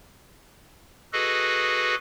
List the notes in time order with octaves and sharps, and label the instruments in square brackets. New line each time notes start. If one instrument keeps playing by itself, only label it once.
[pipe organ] F#4 G#4 A4 B4 D#5